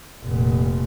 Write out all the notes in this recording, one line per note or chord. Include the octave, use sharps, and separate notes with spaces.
F1 A#2